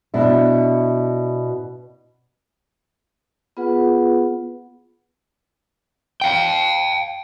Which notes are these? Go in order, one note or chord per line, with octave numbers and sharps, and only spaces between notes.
B2 D4 E4
B3 F4 G#4 B4 F#5
F5 G5